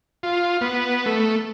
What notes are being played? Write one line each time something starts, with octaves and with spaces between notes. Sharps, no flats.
F4
B3
A3